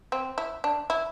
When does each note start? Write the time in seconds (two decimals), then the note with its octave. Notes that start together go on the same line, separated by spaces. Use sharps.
0.12 C4
0.38 E4
0.64 D4
0.90 E4